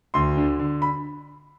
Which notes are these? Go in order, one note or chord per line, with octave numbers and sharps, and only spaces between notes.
D2 C6
D3
D3
B5